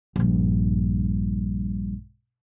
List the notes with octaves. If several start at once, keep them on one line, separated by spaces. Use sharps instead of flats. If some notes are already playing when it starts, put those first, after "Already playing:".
A#1 G2